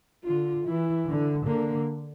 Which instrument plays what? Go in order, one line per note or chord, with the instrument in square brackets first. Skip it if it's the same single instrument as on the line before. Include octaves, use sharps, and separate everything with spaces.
[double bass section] D3 [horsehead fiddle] F4
[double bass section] E3 [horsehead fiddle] E4
[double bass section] D3
[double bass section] D3 [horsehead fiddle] A#3